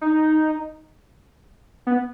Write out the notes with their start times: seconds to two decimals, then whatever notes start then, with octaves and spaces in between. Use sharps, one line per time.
0.01 D#4
1.87 B3